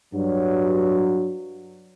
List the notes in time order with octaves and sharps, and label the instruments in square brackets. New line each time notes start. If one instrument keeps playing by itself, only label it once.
[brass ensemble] G2 F#3